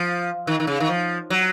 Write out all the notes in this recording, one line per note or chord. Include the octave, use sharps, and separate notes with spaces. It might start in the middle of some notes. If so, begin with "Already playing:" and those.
Already playing: F3
D#3
D#3
C#3
D#3
F3
F#3